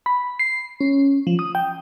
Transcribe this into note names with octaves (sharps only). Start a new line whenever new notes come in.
B5
C7
C#4
F3
D#6
G5